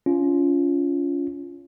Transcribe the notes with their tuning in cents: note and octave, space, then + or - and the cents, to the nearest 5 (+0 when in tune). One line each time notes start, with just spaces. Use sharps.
C#4 +25 F4 -10